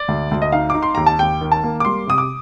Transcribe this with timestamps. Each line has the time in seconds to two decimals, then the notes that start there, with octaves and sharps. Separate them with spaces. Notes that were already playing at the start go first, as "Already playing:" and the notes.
Already playing: D5
0.08 D2
0.31 D2
0.42 D#5
0.52 D#4 F5
0.70 D#4 D6
0.83 C6
0.95 D#2 A#5
1.06 A5
1.19 D#2 G5
1.41 D#3
1.52 A5
1.63 A#3
1.80 D6
1.85 G3 C6
2.07 C3 D#6
2.18 D6